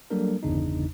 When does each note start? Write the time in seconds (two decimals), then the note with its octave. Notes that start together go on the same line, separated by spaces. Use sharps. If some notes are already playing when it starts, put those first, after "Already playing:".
0.11 F#3 G3 A#3 D4 A4 A#4
0.43 G1 E2 C#3 D4 D#4